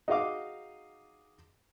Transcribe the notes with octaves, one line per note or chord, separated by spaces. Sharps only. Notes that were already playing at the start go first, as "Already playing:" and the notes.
D#4 F#4 G#4 D#5 F5 D6